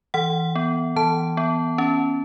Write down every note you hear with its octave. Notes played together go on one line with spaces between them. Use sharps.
E3 F#5
B3
E3 A5
B3
C#4